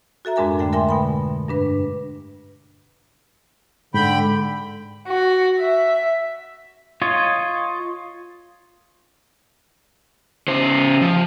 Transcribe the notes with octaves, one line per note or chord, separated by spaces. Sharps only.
F#4 A4 E5 A#5
F2 G#2 G#3 D4 A#4 G#5
D3 A3 G5
A#4 E5 G5 G#5 C6
B2 G5 B5
G2 D4 B4
G#2 D3 G5 B5
F#4
E5
F4 C#5 D#5
C#3 C5
F3